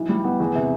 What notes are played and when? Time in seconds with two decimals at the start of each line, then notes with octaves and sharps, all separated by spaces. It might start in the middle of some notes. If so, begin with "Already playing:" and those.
Already playing: B1 E3
0.09 G3
0.24 B3
0.40 E2
0.55 C3